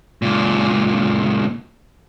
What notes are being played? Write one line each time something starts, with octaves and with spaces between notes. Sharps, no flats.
C#2 A#2